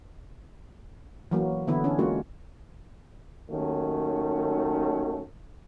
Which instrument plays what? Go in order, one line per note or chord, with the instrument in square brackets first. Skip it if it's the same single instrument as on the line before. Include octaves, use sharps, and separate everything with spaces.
[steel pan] E3 F#3 A#3
D3 E3 B3 E4
C#4 D4 A4
G#3 A#3 C#4 F4 F#4
[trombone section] D#2 D#3 F#3 A3 C#4